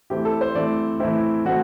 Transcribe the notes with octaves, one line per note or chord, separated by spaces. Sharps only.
E3 A3 C4 G4
A4
C5
E3 A3 C4 D5
E3 A3 C4 E4
E3 A3 C4 F#4